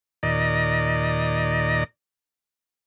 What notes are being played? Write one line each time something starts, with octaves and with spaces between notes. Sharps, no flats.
D#2 A#2 D5 D#5 A#5